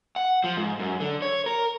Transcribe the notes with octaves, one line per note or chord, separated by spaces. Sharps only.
F#5
F3
G#2
F#2
D3
C#5
A#4